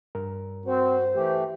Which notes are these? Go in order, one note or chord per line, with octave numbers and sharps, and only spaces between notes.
G2 A#4
C4 F#4 C5
E3 A3 G4